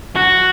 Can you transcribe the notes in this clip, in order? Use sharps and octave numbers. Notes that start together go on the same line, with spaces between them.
F#4